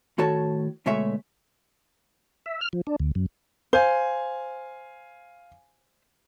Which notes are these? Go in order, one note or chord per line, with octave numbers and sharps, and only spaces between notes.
A2 D#3 F#4 A4 C#5 A5
D2 B2 G#3 A3 C#5 E5
E5
F6
F3
D4
D2
F#2
C5 F5 G#5